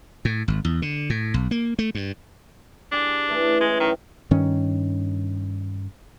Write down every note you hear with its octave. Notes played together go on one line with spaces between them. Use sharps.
A2
G#1
E2
D3
A2
B1
A#3
A3
G2
G3 D4 G#4 G#5
E3 A3
C#3
E3 G#3
F#2 D#3 G5
G2 D#3 C#4